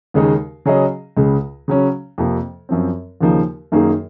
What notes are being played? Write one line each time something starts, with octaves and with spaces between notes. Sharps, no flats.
D#2 C#3 G#3 D#4
C#3 F#3 C#4 G#4 D#5
C#2 C#3 G#3
C#3 F#3 C#4
F2 C3 F3 A#3
F#2 F3 C4
D#2 C#3 F3 A#3 D#4
F#2 D#3 A#3 D#4 G#4